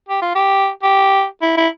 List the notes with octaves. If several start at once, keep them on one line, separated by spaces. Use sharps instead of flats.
G4
F4
G4
G4
E4
E4